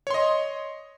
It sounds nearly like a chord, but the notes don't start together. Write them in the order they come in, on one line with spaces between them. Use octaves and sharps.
C#5 C6 D#5